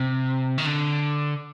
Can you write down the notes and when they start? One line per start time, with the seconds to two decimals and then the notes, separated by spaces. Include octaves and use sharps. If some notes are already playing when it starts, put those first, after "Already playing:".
Already playing: C3
0.58 D#3
0.66 D3